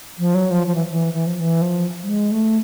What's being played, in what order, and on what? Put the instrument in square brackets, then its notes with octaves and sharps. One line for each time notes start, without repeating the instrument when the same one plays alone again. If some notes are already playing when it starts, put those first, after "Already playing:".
[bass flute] F3
F#3
F3
F3
E3
E3
E3
F3
E3
F3
G3
G#3
A3